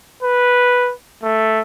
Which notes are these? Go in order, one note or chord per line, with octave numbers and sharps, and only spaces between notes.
B4
A3